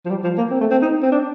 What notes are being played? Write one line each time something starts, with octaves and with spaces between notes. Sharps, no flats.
F3
G3
F3
A#3
C4
A3
C4
D#4
C4
D4